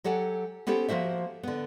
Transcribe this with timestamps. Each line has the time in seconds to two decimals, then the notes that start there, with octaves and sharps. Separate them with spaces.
0.04 F#3 G4 A4 F#5 G#5
0.67 B3 C#4 G4 A4 C5
0.89 F3 A#3 F#4 C5 E5
1.43 D3 B3